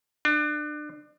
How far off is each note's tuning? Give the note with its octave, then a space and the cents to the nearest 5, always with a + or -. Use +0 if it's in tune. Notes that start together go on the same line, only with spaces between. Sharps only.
D4 +30